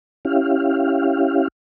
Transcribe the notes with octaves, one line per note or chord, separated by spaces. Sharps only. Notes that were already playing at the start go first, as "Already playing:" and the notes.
C#4 E4 G4 F5